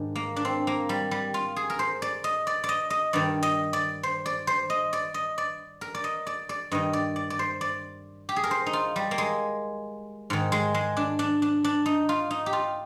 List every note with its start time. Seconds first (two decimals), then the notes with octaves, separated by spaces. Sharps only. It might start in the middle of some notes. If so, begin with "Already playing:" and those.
Already playing: G#2 D#3 D4
0.16 A#3
0.36 D4
0.45 C4
0.67 A#3
0.89 G3
1.11 G3
1.34 F4
1.56 G#4
1.70 A#4
1.79 C5
2.02 D5
2.24 D#5
2.47 D5
2.64 D5
2.69 D#5
2.90 D#5
3.13 G2 D#3 D5
3.43 D#5
3.73 D5
4.03 C5
4.26 D5
4.47 C5
4.70 D#5
4.93 D5
5.14 D#5
5.38 D5
5.81 A#4
5.95 D5
6.04 D#5
6.27 D5
6.49 D5
6.71 G2 D#3 D#5
6.93 D5
7.16 D5
7.30 D5
7.39 C5
7.61 D5
8.29 G4
8.36 G#4
8.44 A#4
8.51 C5
8.66 D#4
8.73 F4
8.96 G3
9.11 A#3
9.18 G#3
10.30 G#2 D#3
10.52 G#3
10.74 G#3
10.97 D4
11.19 D4
11.42 D4
11.64 D4
11.86 D#4
12.09 F4
12.31 D#4
12.46 G4
12.53 F4